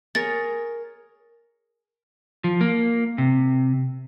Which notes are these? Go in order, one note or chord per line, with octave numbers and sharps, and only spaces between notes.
G#4 A#4 C#5 A6
F3
A#3
C3